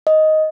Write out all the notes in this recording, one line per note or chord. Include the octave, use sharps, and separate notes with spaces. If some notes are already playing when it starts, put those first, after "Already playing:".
D#5